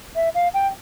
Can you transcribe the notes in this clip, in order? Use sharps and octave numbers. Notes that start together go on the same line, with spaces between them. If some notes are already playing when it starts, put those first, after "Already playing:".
E5
F5
G5